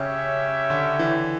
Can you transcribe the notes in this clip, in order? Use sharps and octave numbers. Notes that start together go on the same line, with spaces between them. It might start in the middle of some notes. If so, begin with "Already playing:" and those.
Already playing: C#3 C#4 G4 C#5 E5
D3
E3